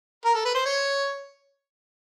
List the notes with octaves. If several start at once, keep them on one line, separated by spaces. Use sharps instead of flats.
A#4
A4
B4
C5
C#5